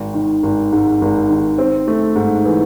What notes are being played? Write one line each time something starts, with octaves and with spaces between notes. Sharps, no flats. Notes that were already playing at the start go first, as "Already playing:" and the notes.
Already playing: G#1
D#3
G#1
G#2
G#1
D#3
C4
A3
G#2
E3